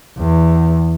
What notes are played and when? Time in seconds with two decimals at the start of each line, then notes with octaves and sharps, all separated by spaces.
0.18 E2